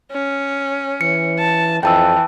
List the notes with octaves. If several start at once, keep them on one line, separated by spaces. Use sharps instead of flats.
C#4
E3 C#7
A5
F2 E3 G5 A5 E6